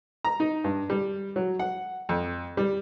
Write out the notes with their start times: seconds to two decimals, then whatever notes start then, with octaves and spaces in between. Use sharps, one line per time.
0.25 A#5
0.40 D#4
0.64 G2
0.90 G3
1.36 F#3
1.59 F#5
2.09 F2
2.57 G3